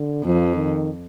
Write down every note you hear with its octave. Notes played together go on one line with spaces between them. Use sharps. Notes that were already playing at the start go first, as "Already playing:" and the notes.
Already playing: D3
F2 F3
D#3